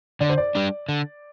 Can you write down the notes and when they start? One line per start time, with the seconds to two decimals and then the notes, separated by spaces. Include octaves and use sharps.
0.20 D3 D5
0.30 C5
0.38 D5
0.55 G3 D4
0.89 D3